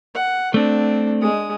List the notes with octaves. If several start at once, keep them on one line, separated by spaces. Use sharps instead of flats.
F#5
A3 C4 D4
G#3 D#6